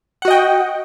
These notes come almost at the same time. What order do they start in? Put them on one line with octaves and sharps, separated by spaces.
F#5 F#4 D#5 G5